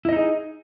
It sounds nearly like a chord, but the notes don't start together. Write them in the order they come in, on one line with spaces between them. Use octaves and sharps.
E4 D#5 D#4 G#4